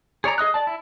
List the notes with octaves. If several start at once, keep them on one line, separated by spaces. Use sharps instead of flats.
G#4 C#5 D5 A#5
G#4 D#5 D#6 F#6
D5 A5
E4